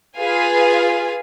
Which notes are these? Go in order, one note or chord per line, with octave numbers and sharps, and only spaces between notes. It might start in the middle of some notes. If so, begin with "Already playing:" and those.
F4 G#4 B4 F5 G#5